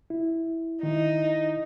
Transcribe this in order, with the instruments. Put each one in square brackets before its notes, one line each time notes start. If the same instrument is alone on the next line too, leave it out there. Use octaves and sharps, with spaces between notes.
[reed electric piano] E4
[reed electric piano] D#3 E4 [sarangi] D#4